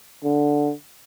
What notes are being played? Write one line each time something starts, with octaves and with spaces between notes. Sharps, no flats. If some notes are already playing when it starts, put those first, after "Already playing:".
D3